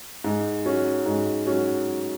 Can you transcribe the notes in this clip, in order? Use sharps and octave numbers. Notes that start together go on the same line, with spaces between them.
G#2
F#3 C#4
G#2
F#3 C#4